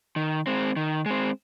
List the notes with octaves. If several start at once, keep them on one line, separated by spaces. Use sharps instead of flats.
D#3
G#3 C4
D#3
G#3 C4